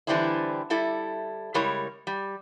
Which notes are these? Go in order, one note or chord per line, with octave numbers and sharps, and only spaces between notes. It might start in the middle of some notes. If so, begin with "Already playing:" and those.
D3 E3 G3 C4 D4 E4
G3 E4 A4
C#3 G3 G#3 E4 A#4 C#5
G3